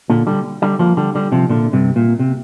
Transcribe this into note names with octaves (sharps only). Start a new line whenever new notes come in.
A#2 D3
D3 G3
D3 G3
F3 A#3
D3 G3
D3 G3
C3 F3
A#2 D3
G2 C3
A#2
C3